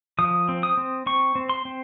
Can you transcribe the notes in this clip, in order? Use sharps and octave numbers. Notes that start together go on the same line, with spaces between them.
F3 D#6
C4
D#6
C4
C4 C#6
C4
C6
C4